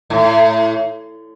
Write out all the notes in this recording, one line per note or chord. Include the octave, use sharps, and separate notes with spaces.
A2